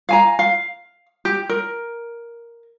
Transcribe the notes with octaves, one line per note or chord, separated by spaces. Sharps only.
F5 G#5 A#5
F5
G4
A#4